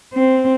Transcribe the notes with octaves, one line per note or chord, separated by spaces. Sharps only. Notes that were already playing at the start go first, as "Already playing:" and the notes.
C4